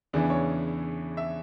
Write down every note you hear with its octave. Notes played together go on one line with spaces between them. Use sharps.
E2 C#3 E3 D4
C#5
E5